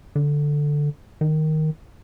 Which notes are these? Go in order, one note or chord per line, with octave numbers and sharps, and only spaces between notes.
D3
D#3